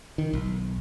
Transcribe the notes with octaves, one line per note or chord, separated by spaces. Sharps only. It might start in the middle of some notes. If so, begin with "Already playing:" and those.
D#3
B1